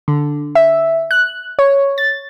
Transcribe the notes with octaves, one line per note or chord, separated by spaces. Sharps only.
D3
E5
F#6
C#5
A6